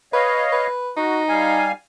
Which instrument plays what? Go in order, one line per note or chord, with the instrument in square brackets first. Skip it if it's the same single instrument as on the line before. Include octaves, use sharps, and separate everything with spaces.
[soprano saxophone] B4 [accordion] C#5 D#5 F5
[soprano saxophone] B4
[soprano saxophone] D#4 [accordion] F#4
[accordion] G3 F5 G#5